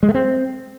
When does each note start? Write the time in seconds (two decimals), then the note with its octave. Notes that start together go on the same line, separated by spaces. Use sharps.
0.03 G#3
0.09 A3
0.14 C4